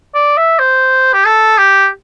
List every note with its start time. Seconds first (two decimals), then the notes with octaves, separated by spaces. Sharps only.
0.14 D5
0.37 E5
0.59 C5
1.13 G4
1.25 A4
1.58 G4